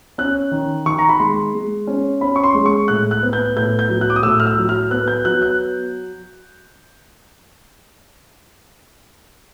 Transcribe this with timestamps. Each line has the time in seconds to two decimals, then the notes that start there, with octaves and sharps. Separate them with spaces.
0.18 C#4 F#6
0.51 D#3
0.86 D#3 C#6
0.99 A#5
1.09 B5
1.20 G#3 C6
1.54 G#3
1.87 C#4
2.21 C#4 B5
2.36 C#6
2.44 C6
2.54 G#3
2.66 C#6
2.88 A2 F#6
3.11 F#6
3.23 B3
3.33 G6
3.56 A2 G6
3.79 G6
3.89 F#3
4.01 F#6
4.10 D6
4.16 D#6
4.23 A2 E6
4.40 F6
4.47 E6
4.58 F#3
4.69 F6
4.91 B3 F#6
5.08 G6
5.25 F#3 F#6
5.42 F#6